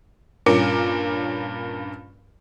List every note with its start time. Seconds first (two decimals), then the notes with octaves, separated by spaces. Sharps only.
0.46 G2 A#2 C#4 A#4 D6 C#7